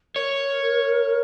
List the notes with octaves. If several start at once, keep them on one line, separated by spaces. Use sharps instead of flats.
A#4 C#5